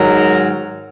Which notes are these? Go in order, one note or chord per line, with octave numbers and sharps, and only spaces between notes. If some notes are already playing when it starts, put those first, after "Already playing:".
Already playing: G#2 D#3 F#3 A#4